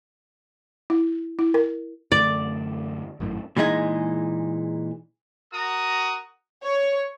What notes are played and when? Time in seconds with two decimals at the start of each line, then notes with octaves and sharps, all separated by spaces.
0.90 E4
1.39 E4
1.54 A#4
2.12 F#2 D3 A3 D5
3.20 G#1 F#2 A2
3.56 A#2 E3 G#3 D#4 G#4
5.53 F#4 A#4 A#5 D#6
6.63 C#5